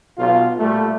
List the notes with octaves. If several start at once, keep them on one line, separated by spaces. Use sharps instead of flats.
B1 F4
A#2 G3 A3